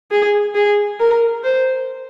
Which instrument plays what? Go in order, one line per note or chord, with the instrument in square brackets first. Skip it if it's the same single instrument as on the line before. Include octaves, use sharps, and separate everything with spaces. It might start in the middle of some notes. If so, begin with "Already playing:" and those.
[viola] G#4
G#4
A#4
C5